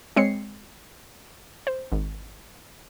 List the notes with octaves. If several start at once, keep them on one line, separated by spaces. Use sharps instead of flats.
G#3 C4 C#5 C7 C#7
C5
G#1